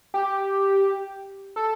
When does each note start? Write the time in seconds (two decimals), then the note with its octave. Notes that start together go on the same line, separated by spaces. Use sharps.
0.14 G4
1.56 A4